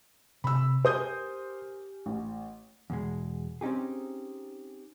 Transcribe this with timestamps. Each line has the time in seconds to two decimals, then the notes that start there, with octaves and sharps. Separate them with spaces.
0.44 C3 B5 E6
0.85 G4 A#4 C5 G#5 D#6 G6
2.06 A1
2.90 E2 B2 G#3
3.61 C4 C#4 D#4 G4 G#4